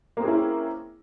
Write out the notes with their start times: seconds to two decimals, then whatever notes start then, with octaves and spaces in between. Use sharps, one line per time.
0.17 A#3
0.20 C4
0.22 G#4
0.25 C#4
0.28 E4